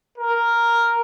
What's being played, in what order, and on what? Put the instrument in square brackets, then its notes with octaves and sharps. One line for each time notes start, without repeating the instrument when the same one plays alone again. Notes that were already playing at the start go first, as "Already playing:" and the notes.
[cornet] A#4